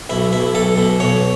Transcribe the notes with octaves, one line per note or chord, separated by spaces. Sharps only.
B1 E4
B1 E4
B1 A4
B2
B1 C#5